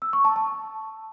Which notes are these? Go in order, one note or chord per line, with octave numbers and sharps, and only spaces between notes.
E6
C#6
A5
A5